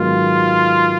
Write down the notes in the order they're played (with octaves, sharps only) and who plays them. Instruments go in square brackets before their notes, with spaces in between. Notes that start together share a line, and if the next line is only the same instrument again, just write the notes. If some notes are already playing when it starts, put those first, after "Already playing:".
Already playing: [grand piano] G#2 D#3 F#3 B3 [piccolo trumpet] F4